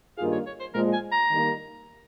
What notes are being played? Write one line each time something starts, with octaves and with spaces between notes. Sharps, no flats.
G2 D#3 A#3 F4 G#4 F5
C#5
C#5
C5
A#2 F3 G#3 A#4
G#5
A#5
D#3 G3 A#3 D#4 A#4